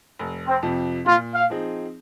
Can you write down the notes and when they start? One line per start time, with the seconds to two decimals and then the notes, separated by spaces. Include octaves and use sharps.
0.19 F1
0.48 C4
0.62 F2 C3 F3
1.06 A#2 F4
1.35 F5
1.50 F3 C4 D#4 G#4